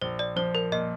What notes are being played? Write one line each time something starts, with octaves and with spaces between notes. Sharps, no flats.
A#1 C5
D5
F3 C5
A#4
A#2 D#5